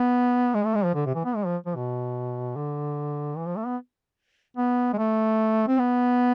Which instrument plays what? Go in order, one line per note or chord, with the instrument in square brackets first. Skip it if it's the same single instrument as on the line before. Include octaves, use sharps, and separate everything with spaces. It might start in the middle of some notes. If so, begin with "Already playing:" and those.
Already playing: [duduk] B3
G#3
A3
G#3
F3
D3
C3
E3
B3
G#3
F3
F3
B2
D3
E3
F3
A3
B3
B3
G#3
A3
C4
B3